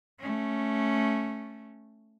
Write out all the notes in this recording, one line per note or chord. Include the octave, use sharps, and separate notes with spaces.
A3 C#4